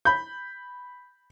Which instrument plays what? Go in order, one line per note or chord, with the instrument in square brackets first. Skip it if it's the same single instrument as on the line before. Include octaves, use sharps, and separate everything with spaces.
[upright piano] B5 G6